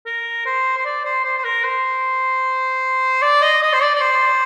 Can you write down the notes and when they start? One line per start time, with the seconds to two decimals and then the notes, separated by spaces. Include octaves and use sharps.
0.06 A#4
0.46 C5
0.77 C5
0.85 D5
1.05 C5
1.25 C5
1.38 C5
1.45 A#4
1.64 C5
3.22 D5
3.42 D#5
3.63 D#5
3.73 C5
3.82 D5
3.95 D5
4.01 C5